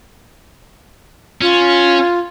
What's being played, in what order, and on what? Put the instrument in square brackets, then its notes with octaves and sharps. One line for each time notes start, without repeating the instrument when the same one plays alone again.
[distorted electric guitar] C#4 [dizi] F4